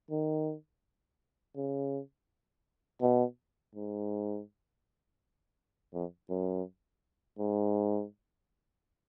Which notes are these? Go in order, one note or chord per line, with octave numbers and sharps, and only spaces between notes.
D#3
C#3
B2
G#2
F2
F#2
G#2